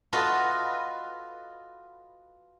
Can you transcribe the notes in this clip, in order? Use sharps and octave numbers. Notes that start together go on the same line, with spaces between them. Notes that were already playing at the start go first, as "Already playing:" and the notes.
F4 F#4 A4 B4 D#5 E5